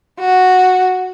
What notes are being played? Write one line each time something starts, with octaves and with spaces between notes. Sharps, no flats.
F#4